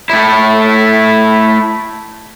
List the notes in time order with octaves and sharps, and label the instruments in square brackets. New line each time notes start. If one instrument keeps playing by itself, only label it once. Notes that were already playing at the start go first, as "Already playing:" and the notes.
[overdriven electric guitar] A3 E4